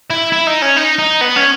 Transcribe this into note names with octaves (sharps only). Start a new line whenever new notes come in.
E4
E4
D#4
C#4
D#4
D#4
B3
C#4